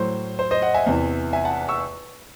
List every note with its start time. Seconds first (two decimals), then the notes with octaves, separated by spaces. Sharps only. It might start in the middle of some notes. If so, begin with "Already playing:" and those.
Already playing: A2 F#3 C5
0.39 C5
0.51 C5 D#5
0.62 D#5 F#5
0.74 E5 G#5
0.86 E2 C3 E3
1.33 E5 G#5
1.45 F#5 A5
1.69 C#6 E6